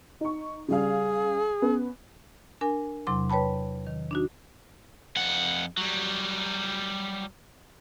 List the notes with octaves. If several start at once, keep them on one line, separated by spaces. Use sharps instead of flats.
D#4 C#6
C#3 G3 G#4 F5
B3 C#4
D4 A#4 G#5
E2 C3 F#3 C6 D6
B4 C#5 G5 A5 B5
D#3
D4 D#4 F#4
F2 F#5
F#3 G3